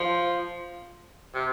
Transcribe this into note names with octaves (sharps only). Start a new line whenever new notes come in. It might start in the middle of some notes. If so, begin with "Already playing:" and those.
Already playing: F3
C3